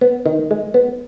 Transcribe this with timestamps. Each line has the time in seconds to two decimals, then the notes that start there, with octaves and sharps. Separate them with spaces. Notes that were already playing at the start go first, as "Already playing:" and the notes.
0.01 B3
0.26 D#3
0.51 G#3
0.74 B3